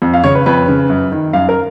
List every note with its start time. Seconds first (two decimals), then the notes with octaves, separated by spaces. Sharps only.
0.02 F2
0.13 F5
0.24 C#3 C#5
0.35 B4
0.46 F2 B4
0.68 C#3
0.90 F#2
1.12 D#3
1.33 F#2 F5
1.49 A#4